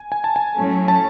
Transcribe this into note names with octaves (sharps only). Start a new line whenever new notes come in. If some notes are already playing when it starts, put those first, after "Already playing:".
Already playing: G#5
G#5
A5
G#5
A2 F#3 A3 C#4
A5